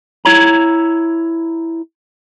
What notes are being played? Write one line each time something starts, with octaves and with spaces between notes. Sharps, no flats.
E4 C#5 A#5